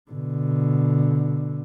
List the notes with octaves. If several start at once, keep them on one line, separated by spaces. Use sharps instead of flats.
B2 D3